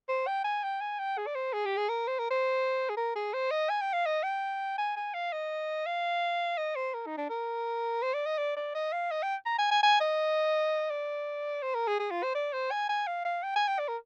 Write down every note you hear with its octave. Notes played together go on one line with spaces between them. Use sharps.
C5
G5
G#5
G5
G#5
G5
G#4
D5
C5
G#4
G4
G#4
A#4
C5
A#4
C5
G#4
A#4
G#4
C5
D#5
G#5
G5
F5
D#5
G5
G#5
G#5
F5
D#5
F5
D#5
C5
A#4
D#4
D4
A#4
C5
D5
D#5
D5
D5
D#5
F5
D#5
G5
A#5
G#5
G#5
G#5
D#5
D5
C5
A#4
G#4
G#4
F4
C5
D5
C5
G#5
G#5
F5
F5
G5
G#5
G5
D5
A#4